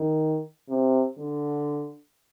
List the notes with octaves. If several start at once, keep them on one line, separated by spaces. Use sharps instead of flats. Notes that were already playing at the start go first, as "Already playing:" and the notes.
Already playing: D#3
C3
D3